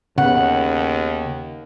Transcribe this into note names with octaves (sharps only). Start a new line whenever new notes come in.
D#2 C#3 B3 F#5